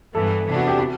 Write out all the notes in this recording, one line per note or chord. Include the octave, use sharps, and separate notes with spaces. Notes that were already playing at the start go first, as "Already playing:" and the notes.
G2 E3 B3 A4
C3 E3 B3 D4
F#4
G4
F#4